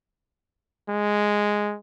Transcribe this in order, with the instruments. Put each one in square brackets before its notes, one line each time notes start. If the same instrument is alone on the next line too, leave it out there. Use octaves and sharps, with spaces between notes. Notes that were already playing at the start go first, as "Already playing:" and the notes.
[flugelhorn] G#3